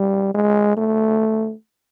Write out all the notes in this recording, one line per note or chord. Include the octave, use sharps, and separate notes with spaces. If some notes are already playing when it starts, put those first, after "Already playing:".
Already playing: G3
G#3
A3